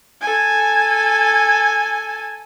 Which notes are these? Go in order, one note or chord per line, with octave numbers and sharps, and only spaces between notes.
A4 G#5